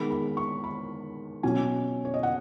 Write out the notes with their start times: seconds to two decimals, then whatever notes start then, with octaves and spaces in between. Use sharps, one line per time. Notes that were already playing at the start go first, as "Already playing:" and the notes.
Already playing: D#3 G#3 B3 B5
0.11 B5
0.37 C#6
0.64 B5
1.43 B2 F#3 C#4 G#5
2.05 C#5
2.14 D#5
2.23 F#5